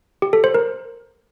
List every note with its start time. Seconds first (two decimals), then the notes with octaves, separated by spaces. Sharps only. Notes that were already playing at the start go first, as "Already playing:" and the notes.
0.22 G4
0.33 A4
0.44 C5
0.55 A#4